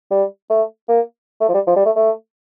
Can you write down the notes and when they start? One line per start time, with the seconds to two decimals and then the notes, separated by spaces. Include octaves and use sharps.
0.11 G3
0.50 A3
0.89 A#3
1.41 A3
1.49 F3
1.54 G3
1.67 F3
1.76 G3
1.85 A3
1.96 A3